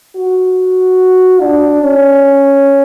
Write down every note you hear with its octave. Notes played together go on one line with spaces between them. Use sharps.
F#4
D4
C#4